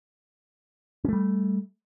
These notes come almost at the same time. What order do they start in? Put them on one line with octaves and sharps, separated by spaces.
C#4 A3 G3